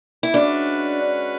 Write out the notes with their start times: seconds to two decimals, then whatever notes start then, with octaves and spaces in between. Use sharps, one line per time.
0.23 E4
0.34 G#3 C#4 D4 F#4 B4